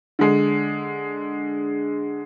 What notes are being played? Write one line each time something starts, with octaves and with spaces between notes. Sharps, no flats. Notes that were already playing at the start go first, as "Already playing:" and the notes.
D3 G#3